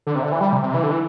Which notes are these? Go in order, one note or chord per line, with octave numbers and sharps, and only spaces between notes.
D3
C3
D3
E3
G3
C3
C3
E3
D3
E3